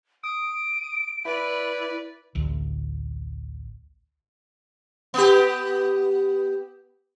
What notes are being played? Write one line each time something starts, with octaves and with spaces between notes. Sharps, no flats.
D#6 D7
E4 B4 D5
A1 D2
B3 G4